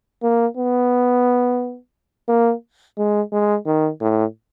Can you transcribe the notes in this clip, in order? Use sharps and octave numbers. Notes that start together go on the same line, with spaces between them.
A#3
B3
A#3
G#3
G#3
D#3
A2